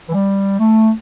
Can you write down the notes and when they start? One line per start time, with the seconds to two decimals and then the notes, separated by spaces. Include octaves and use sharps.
0.09 E3
0.14 G3
0.59 A3